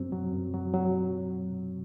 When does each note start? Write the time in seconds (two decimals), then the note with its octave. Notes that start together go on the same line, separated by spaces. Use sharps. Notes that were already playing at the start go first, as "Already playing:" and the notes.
Already playing: F#2 F#3 C4
0.12 F#3
0.33 F#2
0.54 F#3
0.74 F#3